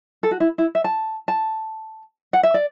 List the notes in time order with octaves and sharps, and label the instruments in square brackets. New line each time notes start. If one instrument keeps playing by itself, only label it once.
[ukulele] A4
F#4
E4
E4
E5
A5
A5
F#5
E5
D5